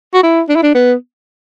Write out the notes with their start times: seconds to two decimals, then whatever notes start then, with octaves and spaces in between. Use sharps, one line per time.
0.14 F#4
0.23 E4
0.49 D4
0.56 E4
0.63 D4
0.75 B3